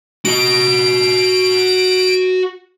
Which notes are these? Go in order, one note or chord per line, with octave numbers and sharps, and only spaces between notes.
F#4 D#5 D7